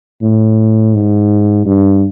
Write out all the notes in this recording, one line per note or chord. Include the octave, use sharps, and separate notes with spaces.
A2
G#2
G2